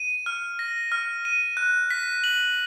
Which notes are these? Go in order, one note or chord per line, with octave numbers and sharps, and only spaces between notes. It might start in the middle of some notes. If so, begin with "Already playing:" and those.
Already playing: D#7
F6
A#6
F6
D#7
F#6
B6
F#7